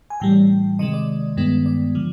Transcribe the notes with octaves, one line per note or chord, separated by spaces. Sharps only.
G#5
A2 E3 G3 G5
C3 D#3 G#3 D#5
D5
G2 D#3 G#3 B3
D5
D3 F3